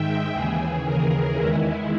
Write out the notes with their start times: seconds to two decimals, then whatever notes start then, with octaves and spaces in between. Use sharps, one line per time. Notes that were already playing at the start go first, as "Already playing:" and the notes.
Already playing: G#2 D#3 G#3 E5 G5
0.33 D#2 C#3 E3 G#4
0.85 A#4
1.36 E2 D#3 G#3 E4